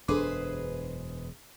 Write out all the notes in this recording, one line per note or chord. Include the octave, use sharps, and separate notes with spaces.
E1 F#2 D4 G#4 A4 B4 C5 D6